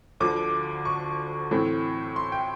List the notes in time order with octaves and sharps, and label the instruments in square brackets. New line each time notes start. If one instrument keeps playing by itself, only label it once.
[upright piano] D2 D3 F3 D6
C#6
A2 E3 A3 C4
C6
G5